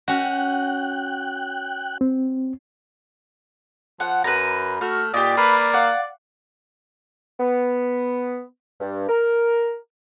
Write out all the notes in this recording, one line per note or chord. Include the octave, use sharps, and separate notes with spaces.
C#4 F#4 G5 F#6
C4
F3 F#5
F#2 B4 A#5
A3 F#4 F6
A#2 D#4 G4 D5
A#3 B4
F5 F#5 D6
B3
G2
A#4